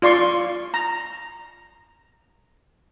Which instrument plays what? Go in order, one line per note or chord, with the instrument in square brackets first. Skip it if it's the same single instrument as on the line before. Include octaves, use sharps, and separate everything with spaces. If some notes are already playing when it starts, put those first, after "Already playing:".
[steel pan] F4 D5 C6 C#6
A#5